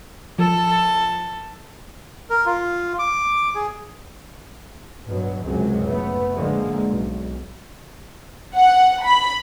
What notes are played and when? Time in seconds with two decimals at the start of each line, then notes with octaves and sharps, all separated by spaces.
0.39 F3 A4
2.30 A#4
2.46 F4
2.99 D6
3.55 G#4
5.06 G2 B2 F#3
5.43 C#2 F#2 C3 F#3 G#3
5.87 F#1 A3 B3
6.35 D3 F3 G#3 A#3
6.90 B1
8.55 F#5
9.03 B5